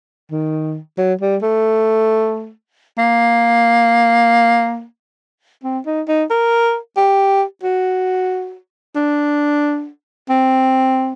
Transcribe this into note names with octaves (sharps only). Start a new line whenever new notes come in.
D#3
F#3
G3
A3
A#3
C4
D#4
D#4
A#4
G4
F#4
D4
C4